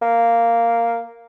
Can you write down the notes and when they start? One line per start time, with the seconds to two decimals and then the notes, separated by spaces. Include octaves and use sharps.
0.02 A#3